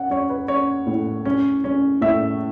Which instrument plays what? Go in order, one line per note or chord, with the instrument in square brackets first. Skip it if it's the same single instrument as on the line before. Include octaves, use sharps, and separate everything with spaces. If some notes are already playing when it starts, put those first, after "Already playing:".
Already playing: [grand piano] C#4 F#5
C#4 C#5
B4
C#4 C#5
A2
C#4
C#4
A2 E5